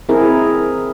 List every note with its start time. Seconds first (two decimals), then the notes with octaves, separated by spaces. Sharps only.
0.09 C4 E4 G#4 A#4